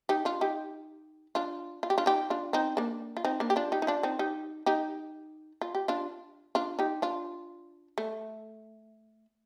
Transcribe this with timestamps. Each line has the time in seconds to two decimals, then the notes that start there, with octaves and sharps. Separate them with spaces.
0.09 D#4 G4
0.25 D4 F4
0.41 D#4 G4
1.35 D4 F4
1.83 F4
1.90 G4
1.98 D4 F4
2.06 D#4 G4
2.30 D4 F4
2.53 C4 D#4
2.77 A#3 D4
3.17 F4
3.25 C4 D#4
3.40 A#3 D4
3.50 G4
3.56 D4 F4
3.72 D#4 G4
3.82 D#4
3.87 D4 F4
4.03 C4 D#4
4.19 D#4 G4
4.66 D#4 G4
5.61 F4
5.75 G4
5.88 D4 F4
6.55 D4 F4
6.79 D#4 G4
7.02 D4 F4
7.98 A3